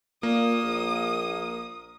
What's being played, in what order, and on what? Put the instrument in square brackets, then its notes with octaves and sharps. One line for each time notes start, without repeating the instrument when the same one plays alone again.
[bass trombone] A#2 [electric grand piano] A#3 [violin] D#6
[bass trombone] A#1